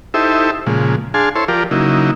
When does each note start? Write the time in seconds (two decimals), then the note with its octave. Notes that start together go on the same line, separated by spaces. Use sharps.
0.14 D#4 E4 G4 A4 C5 E5
0.67 A#2 C#3 F3 G#3
1.14 D4 G#4 F5 G#5 A5 C6
1.36 E4 A4 C5 C#5 C6
1.48 F3 F4 G4 A#4 D5
1.71 C#3 F#3 A#3 D#4 E4